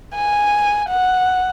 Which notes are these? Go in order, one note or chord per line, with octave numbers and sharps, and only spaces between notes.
G#5
F#5